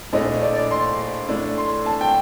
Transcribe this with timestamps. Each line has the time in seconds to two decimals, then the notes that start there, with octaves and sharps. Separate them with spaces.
0.13 A#1 A2 A3 D4 D#5
0.42 D5
0.56 D5
0.71 C6
1.29 A2 A3 D4
1.58 C6
1.86 A5
2.01 G5